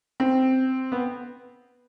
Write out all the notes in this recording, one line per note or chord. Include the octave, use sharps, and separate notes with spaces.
C4
B3